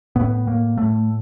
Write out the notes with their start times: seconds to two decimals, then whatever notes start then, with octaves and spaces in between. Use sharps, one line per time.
0.16 A2 B3
0.47 A2 A#3
0.78 A2 A3